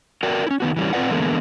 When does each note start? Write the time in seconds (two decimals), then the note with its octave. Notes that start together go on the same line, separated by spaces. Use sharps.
0.23 F#4 A#4 D5 G5
0.47 C#4 E4
0.60 D#3 B3 F#4
0.77 E3 G3 C#4
0.93 C4 F4 G#4 B4 D5 F#5
1.10 D3 E3 G#3 A#3 B3